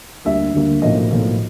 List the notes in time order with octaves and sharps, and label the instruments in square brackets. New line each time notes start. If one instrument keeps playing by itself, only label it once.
[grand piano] D2 D3 G3 A#3 E5
D2 D3 G3 A#3
B1 A2 F3 A#3 D#5
B1 A2 F3 A#3